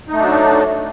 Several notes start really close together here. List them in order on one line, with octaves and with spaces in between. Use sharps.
D#4 A3 D4 F#3